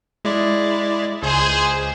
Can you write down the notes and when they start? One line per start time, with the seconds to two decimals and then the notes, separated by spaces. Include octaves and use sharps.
0.25 G#3 E4 D5
1.23 C#2 G#4 C5